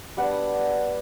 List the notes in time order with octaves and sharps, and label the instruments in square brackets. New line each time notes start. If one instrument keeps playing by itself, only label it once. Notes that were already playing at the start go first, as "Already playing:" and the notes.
[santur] G3 B3 D4 F#5